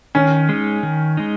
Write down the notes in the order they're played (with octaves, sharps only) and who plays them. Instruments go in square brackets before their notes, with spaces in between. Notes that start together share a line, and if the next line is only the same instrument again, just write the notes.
[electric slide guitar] D#3 [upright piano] C#4
[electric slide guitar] G#3 D#4
D#3
G#3 D#4